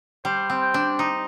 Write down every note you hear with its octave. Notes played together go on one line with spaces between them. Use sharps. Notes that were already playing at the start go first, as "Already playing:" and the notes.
G3 C5
C4
G5
D4
D#4